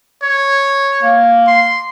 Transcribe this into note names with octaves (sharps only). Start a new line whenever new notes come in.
C#5
A#3
C6